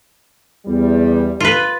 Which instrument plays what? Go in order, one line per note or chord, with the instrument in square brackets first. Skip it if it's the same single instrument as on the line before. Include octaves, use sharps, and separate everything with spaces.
[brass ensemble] E2 G3
[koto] F4 B4